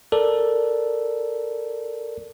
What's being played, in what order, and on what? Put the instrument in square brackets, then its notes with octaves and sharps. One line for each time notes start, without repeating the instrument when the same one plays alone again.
[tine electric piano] A4 A#4 D5